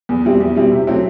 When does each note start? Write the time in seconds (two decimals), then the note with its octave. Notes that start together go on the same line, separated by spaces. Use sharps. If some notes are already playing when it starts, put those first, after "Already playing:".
0.09 E2
0.25 B2 G3 C4 E4
0.40 E2
0.56 B2 G3 C4 E4
0.71 C3
0.87 F#3 A3 C4 E4